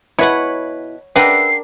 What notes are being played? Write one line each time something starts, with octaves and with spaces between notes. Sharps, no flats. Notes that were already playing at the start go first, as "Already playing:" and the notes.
B2 E4 B4 C#5 F#5
D4 A#4 B4 E5 F#5 G5 C7